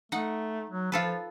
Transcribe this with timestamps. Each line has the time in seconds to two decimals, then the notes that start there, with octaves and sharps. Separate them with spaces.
0.12 A3 D#4 F#5
0.70 F#3
0.92 F3 F4 A4 B4